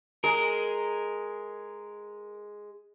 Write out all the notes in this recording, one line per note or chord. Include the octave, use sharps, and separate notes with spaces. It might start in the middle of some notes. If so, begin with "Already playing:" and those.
G#3 G#4 A#4